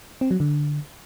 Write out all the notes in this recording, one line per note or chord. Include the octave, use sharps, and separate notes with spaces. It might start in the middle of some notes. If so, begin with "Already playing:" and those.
C4
F#3
D3